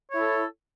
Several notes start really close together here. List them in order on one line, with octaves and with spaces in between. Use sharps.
C#5 E4 A4